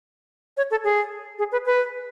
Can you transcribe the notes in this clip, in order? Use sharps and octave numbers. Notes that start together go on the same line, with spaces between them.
C#5
A4
G#4
G#4
B4
B4